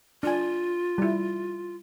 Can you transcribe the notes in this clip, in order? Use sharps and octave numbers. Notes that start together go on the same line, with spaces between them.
D4 F4 G#5
G3 E4